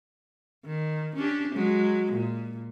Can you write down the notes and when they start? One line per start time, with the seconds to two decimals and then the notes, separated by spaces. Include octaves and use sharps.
0.66 D#3
1.16 C#4 D4 G4
1.55 F#3 G#3
2.12 A#2